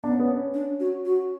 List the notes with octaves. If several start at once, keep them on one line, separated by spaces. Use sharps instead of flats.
B3 D4
C#4
B3
C#4
D4
F#4
F#4